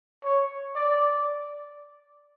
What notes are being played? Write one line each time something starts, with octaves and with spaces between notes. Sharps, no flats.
C#5
D5